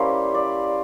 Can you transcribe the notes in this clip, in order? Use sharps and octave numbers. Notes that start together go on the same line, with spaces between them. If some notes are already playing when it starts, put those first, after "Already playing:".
Already playing: G3 A#3 C#4 E4 C5
D5